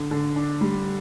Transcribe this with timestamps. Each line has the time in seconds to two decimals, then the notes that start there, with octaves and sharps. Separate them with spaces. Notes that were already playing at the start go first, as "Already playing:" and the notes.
Already playing: D3
0.11 D3
0.36 D4
0.61 G3